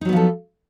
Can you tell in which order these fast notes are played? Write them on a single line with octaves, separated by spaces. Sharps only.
D#4 F#3 B3 F3 A4